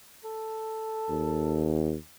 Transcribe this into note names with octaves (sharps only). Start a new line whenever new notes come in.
A4
D#2